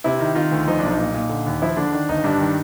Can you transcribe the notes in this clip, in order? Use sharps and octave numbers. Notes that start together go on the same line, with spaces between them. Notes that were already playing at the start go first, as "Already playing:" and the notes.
C3 E4
D#3
D#3 F4
D2
F3 D#4
B1 D4
D#4
A#2
A#2
D3
D#2
F3 E4
D3 D4
D#3 D4
G1 D#4
G2 D4
D#3